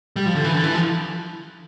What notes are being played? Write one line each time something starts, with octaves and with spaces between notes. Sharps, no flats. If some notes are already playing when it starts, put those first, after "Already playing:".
G3
F3
D3
E3
D3
E3
F3